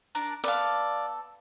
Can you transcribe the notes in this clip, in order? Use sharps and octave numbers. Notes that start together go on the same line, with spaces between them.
D4 A#4 D5
B3 A4 D5 F5